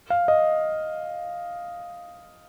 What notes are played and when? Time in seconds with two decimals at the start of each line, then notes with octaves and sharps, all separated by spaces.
0.10 F5
0.28 D#5